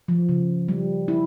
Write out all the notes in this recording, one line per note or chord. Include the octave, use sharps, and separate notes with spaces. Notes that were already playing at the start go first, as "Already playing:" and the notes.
F3
C#3
G3
E4